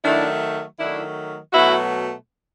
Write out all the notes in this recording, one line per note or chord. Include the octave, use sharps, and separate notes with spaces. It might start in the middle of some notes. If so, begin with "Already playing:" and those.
D#3 F#3 A3 D4 E4
D#3 F#3 A3 D4 E4
B2 F#3 A3 E4 F#4